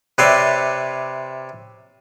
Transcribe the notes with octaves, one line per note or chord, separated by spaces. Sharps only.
C3 B4 C#5 D5 E5 C6